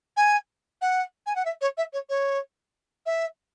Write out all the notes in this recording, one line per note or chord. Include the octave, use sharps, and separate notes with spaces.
G#5
F#5
G#5
F#5
E5
C#5
E5
C#5
C#5
E5